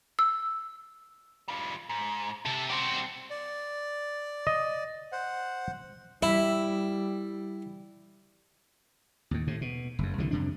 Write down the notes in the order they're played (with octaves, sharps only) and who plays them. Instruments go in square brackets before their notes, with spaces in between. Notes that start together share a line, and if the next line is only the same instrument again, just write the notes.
[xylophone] E6
[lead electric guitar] G3 F4
G#2
[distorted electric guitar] C3 [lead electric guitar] A4
[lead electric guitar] G3 C4 [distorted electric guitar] F#4 D5
[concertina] D5
[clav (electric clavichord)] D#5
[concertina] C5 F#5
[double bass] G3 [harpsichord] E4 [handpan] E5
[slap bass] D#2 A2
A2 C3
B2
F#1 F#2
C2 D3 E3 F#3
F2 C3 D4